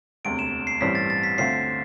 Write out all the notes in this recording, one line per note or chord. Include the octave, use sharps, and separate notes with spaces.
E1 D2 C3 D7
E7
C7
A1 G2 E3 G3 C4 B6
A6
A6
B6
D2 D3 A3 C4 F4 C7